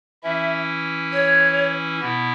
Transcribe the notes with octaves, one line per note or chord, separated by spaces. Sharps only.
E3 C#4 E4 E5
C#5
B2 B3 E4